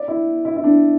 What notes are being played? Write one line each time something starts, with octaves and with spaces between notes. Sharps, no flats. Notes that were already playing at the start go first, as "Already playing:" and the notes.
Already playing: D5
E4
E4
E4
D4